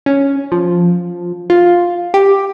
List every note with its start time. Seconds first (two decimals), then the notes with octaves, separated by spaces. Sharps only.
0.06 C#4
0.52 F3
1.50 F4
2.14 G4